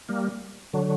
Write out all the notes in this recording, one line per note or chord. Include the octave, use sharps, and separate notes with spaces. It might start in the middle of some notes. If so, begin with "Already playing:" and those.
G3 A#3
D3 F#3